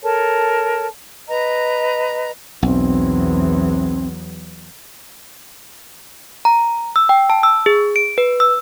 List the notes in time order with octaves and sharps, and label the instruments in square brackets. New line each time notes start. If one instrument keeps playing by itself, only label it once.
[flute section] A4 A#4 C#5 A5
B4 D#5 A#5
[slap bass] B1 [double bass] E2 F#3 [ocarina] C4
[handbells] A#5
E6
G5
A5
E6
G#4
D7
B4
E6